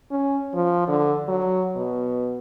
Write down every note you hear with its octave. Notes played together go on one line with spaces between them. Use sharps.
C#4
F3
D3
F#3
B2